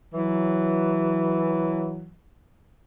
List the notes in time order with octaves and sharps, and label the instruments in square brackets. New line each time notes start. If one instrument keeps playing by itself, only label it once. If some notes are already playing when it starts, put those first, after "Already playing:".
[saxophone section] E3 F#3